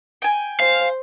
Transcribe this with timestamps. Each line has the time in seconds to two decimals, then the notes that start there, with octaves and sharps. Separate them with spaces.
0.22 G5 G#5
0.60 C5 F5